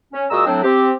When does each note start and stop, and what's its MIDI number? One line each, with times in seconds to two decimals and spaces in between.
0.13 0.24 61
0.31 0.43 46
0.31 0.43 56
0.31 0.43 66
0.31 0.43 75
0.31 0.43 82
0.31 0.43 88
0.46 0.62 45
0.46 0.62 54
0.46 0.62 60
0.46 0.62 62
0.63 0.92 60
0.63 0.92 67